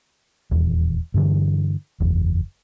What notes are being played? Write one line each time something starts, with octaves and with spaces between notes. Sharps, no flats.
D#1 E2
G2 D3 E3
F#1 E2